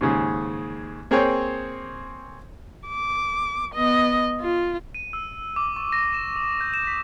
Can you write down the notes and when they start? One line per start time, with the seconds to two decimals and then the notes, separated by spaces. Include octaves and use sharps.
0.01 D#2 G#2 C#3
1.11 A#3 C4 G#4 C5 C#5 G5
2.88 D6
3.74 B3 D#5
4.40 F4
4.95 D#7
5.13 E6
5.56 D6
5.76 C#6
5.92 A#6
6.13 E7
6.36 D#6
6.61 G6
6.74 E7
6.87 B6